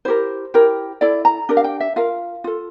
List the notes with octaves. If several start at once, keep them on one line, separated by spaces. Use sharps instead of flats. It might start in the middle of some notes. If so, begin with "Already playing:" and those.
E4 G4 A#4 C5
E4 G4 A#4
E4 A4 D5
A#5
D4 G4 A#4
F5
G5
E5
F4 A#4 F5
F4 A4